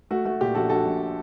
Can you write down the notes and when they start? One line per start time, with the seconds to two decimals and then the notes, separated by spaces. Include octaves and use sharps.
0.11 A3 F#4
0.25 A3 F#4
0.41 A#2 G4
0.55 A#1 F#4 A4
0.69 A#1 F#4 A4
0.86 A#1